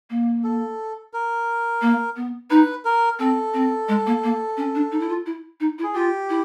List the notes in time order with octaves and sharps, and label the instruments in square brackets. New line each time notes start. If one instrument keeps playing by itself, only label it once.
[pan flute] A#3
[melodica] A4
A#4
[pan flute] A#3
B3
[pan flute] D#4 [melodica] B4
[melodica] A#4
[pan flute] C4 [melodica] A4
[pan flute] C4
G#3
A#3
A#3
C#4
D4
D#4
E4
F4
E4
D#4
E4
[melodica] G#4
[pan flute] F4 [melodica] G4
[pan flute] E4